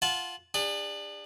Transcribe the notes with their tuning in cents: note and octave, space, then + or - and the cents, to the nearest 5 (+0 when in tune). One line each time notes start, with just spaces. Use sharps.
F4 +0 F#5 -5 A5 -25
D4 +10 G#4 -45